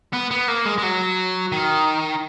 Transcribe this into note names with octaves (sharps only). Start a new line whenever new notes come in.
B3
B3
A#3
G#3
G#3
F#3
D#3